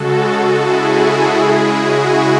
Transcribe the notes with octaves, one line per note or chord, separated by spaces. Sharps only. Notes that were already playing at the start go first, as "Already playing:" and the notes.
Already playing: C#3 G#3 F#4 A4
E4 G#4
E4 G#4
C#3 G#3
F#4